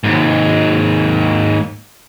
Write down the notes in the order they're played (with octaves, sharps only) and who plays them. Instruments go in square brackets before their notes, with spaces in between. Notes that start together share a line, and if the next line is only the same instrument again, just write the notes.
[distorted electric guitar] D#2 G#2